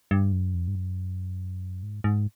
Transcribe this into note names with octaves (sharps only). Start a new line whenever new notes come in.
G2
F#2
F2
G2
F#2
G#2
G#2